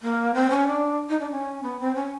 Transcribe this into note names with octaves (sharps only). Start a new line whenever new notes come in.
A#3
C4
C#4
D4
D#4
D4
C#4
B3
C4
C#4